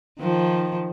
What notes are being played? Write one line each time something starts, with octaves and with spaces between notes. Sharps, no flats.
D#3 F3